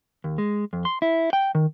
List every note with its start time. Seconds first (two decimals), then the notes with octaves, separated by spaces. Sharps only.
0.24 D#2
0.38 G#3
0.73 F2
0.85 C6
1.02 E4
1.33 G5
1.55 D#3